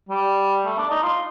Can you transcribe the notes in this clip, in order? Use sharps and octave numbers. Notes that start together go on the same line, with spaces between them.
G3
A3
D4
D#4
F4